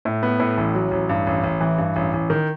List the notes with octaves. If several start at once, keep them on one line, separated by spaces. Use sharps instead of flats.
A2
B3
A2
A1
F#3
A1
G2
A1
A1
E3
G2
A1
A1
D#3